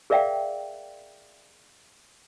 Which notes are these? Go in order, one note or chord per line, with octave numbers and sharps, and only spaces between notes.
G#4 A#4 D5 E5 F5 G5